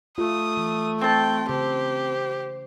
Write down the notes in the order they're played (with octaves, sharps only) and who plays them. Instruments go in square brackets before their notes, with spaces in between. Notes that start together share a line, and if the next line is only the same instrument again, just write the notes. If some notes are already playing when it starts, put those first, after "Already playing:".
[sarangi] A3 [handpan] F4 [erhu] D#6
[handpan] E3
[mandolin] C4 A5 [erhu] G5
[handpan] C#3 [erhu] G4 [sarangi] C5